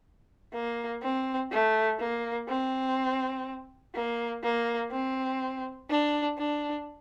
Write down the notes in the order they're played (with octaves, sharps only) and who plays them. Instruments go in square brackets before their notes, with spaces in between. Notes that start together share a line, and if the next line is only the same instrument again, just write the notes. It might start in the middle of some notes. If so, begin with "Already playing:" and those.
[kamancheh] A#3
C4
A3
A#3
C4
A#3
A#3
C4
D4
D4